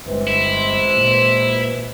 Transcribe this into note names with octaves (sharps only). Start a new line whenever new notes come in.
G1 C3 E3 G#3
E4
A#2